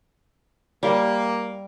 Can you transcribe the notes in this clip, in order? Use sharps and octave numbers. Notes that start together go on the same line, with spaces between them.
G3 A#3